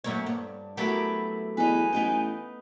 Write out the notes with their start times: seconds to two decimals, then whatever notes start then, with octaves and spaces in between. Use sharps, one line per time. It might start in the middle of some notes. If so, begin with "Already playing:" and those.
0.04 F#2 A#3 C#5
0.26 G2
0.77 F#3 A3 B3 E4 G4 A#4
1.57 E2 D#4 B4 G#5
1.93 A1 B3 D#4 G5